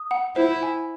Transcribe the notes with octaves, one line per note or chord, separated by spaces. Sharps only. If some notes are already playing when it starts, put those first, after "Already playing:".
Already playing: D#6
F#5
E4 C5
G#5